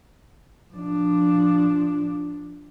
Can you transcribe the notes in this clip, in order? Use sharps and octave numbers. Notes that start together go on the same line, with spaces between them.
F3 D4